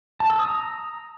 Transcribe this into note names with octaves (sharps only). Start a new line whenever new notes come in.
A5
E6
D#6
A#5